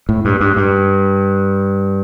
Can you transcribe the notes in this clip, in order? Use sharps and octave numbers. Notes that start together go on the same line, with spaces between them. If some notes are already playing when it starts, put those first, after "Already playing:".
A2
G2
G2
G2